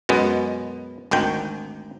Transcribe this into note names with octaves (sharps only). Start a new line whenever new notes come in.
F#2 B2 G#3 B3
G#1 D2 D#3 G5